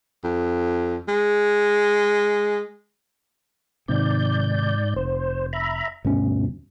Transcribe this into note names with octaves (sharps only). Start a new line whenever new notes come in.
F2
G#3
G#2 C3 D#3 D5 G6
F1 C5
E5 A#5 B5
D2 G2 B2 C#4